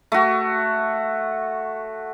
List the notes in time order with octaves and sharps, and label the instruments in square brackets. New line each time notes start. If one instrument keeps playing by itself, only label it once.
[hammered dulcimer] A3 F#4